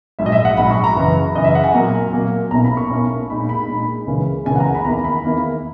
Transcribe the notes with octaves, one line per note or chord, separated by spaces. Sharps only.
A#1 G#2 F#3 E5
D#5
E5
F#5
A#1 G#2 F#3 B5
C#6
A#5
F#2 C#3 E3
F#2 C#3 E3 D#5
E5
F#5
G#5
A#2 F#3 A#3 A#5
A#2 F#3 A#3
B1 B2 A#3 C#4 E4 A#5
B5
C#6
B1 B2 A#3 C#4 E4
A#2 G#3 D#4 B5
B5
A#2 G#3 D#4
C#2 C#3 E3 A#3 C#4
C#2 C#3 E3 A#3 C#4 G#5
F#5
A#5
G#5
B5
E2 D#3 A#3 E4 A#5
B5
E2 D#3 A#3 E4